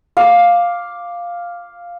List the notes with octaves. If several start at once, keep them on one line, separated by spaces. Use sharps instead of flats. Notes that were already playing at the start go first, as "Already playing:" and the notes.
F5 D6